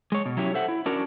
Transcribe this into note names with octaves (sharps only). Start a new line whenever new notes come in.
G#3 C#5
B2
F#3 C#4 E4 G4 C#5
A4 C5 E5 F#5
E4
C#4 D4 F#4 A#4